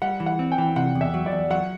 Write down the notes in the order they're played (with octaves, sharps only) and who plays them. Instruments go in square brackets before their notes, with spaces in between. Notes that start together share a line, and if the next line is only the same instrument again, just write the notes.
[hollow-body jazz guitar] G3 [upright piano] F#5
[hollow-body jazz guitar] E3
[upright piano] F#5
[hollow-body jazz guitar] C4
[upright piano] G5
[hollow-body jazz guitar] E3
[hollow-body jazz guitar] C3 [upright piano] F#5
[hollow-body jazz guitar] E2
[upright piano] E5
[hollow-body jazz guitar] F#3
[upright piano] D5
[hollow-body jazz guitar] E2
[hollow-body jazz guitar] F#3 [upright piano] F#5